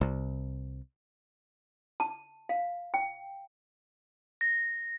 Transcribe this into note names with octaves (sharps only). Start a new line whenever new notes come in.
C2
A5
F5
G5
A#6